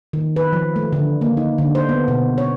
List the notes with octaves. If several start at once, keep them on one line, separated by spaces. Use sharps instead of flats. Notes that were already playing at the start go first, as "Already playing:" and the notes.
D#3
B4
F3
A3
D3
A#3
D#4
D3
C5
B3
B2
C#5